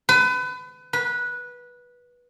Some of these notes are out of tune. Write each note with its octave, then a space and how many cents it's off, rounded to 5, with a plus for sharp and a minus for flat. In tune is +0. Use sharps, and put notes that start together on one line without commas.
B4 +30
B4 -15